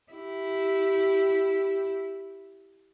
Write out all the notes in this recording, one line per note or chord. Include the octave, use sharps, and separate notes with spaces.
E4 G4